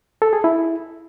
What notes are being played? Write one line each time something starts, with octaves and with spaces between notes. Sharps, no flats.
A4
G#4
E4